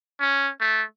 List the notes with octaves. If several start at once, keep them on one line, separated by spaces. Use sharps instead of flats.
C#4
A3